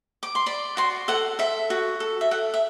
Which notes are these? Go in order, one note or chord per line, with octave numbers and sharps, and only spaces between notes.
D6
C6
D5 B5
F#4 C6
A4 F#5
A4 E5
F#4
A4
E5
A4 F#5
E5